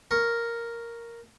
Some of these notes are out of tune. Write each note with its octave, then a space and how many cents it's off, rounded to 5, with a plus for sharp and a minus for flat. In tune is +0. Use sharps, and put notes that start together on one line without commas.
A#4 +0 C#6 +0